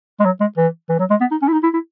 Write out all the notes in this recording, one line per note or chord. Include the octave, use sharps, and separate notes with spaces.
G#3
F#3
G#3
E3
E3
F#3
G#3
B3
D#4
C#4
E4
D#4
E4
E4